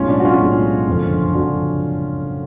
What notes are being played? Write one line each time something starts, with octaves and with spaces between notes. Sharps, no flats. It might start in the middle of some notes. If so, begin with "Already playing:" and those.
Already playing: B1 A2 G#3 C#4 F4
D4
F#4
C#4 F4
B1 A2 G#3
F#1 F2 D3 F3
F#1 F2 D3 F3 D4 F#4